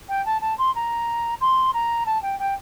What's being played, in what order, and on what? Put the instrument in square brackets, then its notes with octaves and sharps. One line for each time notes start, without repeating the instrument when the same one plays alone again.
[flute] G5
A5
A5
C6
A#5
C6
A#5
A5
G5
G5